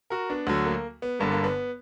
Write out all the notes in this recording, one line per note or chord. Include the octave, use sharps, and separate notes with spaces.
F#4 A#4
B3 D4
D2 D3 F#3
A#3
B3
G1 G2 D3 A#3
A#3
B3